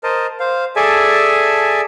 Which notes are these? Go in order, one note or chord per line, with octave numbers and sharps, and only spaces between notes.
A#4 C5 D#5 A5
C5 F5
G#4 A4 D5 E5 G#5 A5